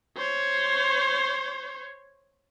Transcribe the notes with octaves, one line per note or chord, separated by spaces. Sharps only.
C5 C#5